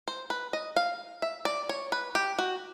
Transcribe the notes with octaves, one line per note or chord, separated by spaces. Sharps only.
C5
B4
D#5
F5
E5
D5
C#5
B4
G4
F#4